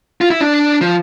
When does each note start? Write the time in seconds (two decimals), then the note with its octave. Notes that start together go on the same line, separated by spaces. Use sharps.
0.21 F4
0.30 E4
0.41 D4
0.81 F3